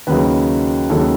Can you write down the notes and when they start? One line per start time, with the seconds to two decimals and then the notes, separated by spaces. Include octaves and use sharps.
0.07 D#2 C#3 F#3 B4
0.90 D#2 C#3 F#3 A4